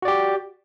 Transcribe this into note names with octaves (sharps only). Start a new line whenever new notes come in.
F#4 G4 D5